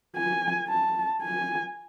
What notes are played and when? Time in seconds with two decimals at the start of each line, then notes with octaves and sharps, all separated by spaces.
0.16 G#5
0.68 A5
1.22 G#5